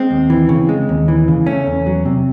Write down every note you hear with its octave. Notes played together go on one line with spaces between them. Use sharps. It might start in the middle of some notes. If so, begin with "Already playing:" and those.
Already playing: G#3 C4
D#2
E3
C#3
G#3
D#2
E3
C#3
A3 C#4
E2
F#3
C3